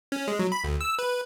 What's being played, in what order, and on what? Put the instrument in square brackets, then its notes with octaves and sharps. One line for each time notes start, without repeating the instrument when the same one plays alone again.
[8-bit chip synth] C#4
G#3
F#3
B5
D2
E6
B4